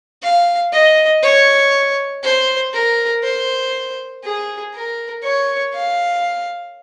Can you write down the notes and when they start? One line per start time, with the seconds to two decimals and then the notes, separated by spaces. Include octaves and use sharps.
0.22 F5
0.73 D#5
1.22 C#5
2.23 C5
2.73 A#4
3.23 C5
4.24 G#4
4.74 A#4
5.23 C#5
5.74 F5